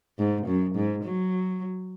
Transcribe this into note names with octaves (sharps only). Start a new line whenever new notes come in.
G#2
F#2
G#2
F#3